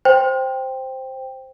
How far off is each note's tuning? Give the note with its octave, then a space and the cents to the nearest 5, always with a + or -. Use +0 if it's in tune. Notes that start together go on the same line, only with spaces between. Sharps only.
C5 +0 G5 +5